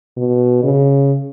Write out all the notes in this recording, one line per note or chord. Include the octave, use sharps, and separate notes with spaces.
B2
C#3